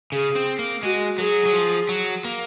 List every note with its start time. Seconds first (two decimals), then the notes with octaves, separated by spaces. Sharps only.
0.12 C#3 G#4
0.35 C4
0.59 A#3
0.83 G#3 F#4
1.18 F#3 G#4
1.46 F#3
1.53 F3
1.89 F#3
2.25 A#3